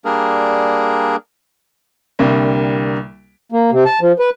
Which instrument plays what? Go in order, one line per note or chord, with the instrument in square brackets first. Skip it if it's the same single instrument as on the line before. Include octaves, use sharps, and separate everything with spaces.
[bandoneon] G3 A#3 D4 G#4 A#4
[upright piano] C2 D3 G3 A#3
[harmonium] A#3
C3
A5
F3
B4